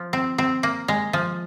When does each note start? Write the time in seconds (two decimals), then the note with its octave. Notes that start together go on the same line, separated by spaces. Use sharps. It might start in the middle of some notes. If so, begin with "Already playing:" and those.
Already playing: F3
0.13 C4
0.38 C4
0.63 A#3
0.88 G#3
1.13 F3